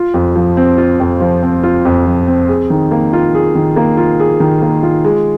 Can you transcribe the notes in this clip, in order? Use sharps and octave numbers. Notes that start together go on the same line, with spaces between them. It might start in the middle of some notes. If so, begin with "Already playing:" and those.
Already playing: F4
F2
F3
C4
F4
F2
F3
C4
F4
F2
F3
C4
G#4
D#3
A#3
F4
G#4
D#3
A#3
F4
G#4
D#3
A#3
F4
G#3